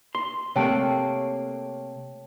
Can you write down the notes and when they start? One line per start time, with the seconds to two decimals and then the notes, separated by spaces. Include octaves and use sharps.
0.15 C6
0.56 C3 A3 A#3 C#5 G5 A5